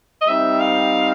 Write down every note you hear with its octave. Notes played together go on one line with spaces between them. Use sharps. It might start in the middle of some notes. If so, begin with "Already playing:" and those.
D#5
G3 C4 D#4 E5
F5